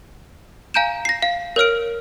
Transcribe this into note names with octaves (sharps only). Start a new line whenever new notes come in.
F5 G#5 A#5 G6 D7 E7
A#6 C7
F5
A#4 C#5 F6 D7